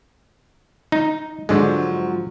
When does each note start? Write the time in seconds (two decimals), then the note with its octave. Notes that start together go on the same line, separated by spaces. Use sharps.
0.92 D#4
1.49 G#2 D3 F3 F#3 G#3